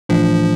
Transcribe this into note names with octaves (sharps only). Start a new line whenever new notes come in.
A2 E3 F3 A3 D4 F4